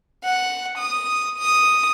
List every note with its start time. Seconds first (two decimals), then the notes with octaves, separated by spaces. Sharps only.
0.24 F#5
0.78 D#6
1.38 D#6